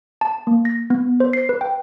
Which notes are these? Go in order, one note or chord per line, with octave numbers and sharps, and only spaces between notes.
A5
A#3
A#6
B3
C5
C7
B4
G5